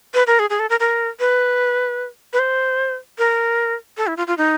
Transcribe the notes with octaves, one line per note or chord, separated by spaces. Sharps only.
B4
A#4
G#4
G#4
A4
A#4
A#4
B4
B4
C5
A#4
A4
E4
F4
F4
D#4